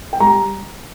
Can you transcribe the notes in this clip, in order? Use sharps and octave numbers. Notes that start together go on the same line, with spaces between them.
G5
G3 A#5